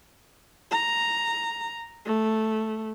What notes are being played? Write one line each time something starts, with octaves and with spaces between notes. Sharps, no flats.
A#5
A3